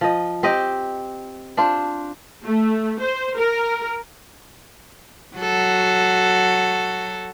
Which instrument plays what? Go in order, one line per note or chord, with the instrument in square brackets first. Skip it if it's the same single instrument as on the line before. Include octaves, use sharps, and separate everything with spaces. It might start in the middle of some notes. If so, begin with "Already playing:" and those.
[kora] F3 D#5
C4 G4 D#5 G5
D4 F4 C5
[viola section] A3
C5
A#4
[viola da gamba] F#3 F#4 A4